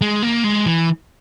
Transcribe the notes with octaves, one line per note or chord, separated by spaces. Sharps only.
G#3
A#3
G#3
E3